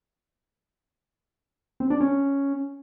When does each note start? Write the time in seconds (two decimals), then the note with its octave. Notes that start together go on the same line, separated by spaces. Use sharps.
1.80 C4
1.90 D4
2.01 C#4